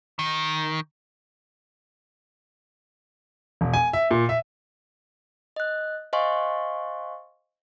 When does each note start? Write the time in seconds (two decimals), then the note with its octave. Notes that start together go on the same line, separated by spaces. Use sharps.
0.19 D#3
3.61 E1
3.74 G#5
3.93 E5
4.11 A#2
4.29 E5
5.56 D#5 F#6
6.13 C5 D#5 F5 G#5 C6 C#6